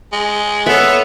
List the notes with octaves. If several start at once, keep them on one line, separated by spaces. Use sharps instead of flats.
G#3
B3 A4 C#5 E5